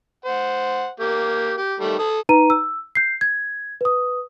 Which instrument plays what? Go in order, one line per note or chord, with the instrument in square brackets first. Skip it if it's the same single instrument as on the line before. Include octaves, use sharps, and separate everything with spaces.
[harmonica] C5 F#5
A#3 G4
G4
D#3 G3 A3
A4 D#6
[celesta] D#4 B4 A#5 D#7
E6
G6 C7
G#6
B4 D#6